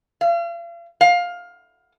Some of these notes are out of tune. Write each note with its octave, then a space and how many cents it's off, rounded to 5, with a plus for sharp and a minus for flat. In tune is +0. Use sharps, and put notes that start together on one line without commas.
F5 -40
F5 +15